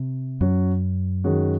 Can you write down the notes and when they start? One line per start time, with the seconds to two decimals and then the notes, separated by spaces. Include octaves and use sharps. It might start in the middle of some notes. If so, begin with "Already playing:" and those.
Already playing: C3
0.41 F#2 F#3 C#4 F#4
1.24 D#3 G#3 C#4 F#4